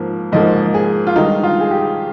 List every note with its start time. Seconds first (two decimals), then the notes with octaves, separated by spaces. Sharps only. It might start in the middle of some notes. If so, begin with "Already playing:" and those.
Already playing: G#2 F3 A#3
0.32 G#2 F3 A#3 D#5
0.74 G#4
1.07 F4
1.16 G2 D#3 G#3 D#4
1.43 F4
1.61 G#4
1.71 G4